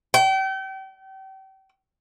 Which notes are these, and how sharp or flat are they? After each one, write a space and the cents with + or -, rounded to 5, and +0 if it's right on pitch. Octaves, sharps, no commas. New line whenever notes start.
G5 -35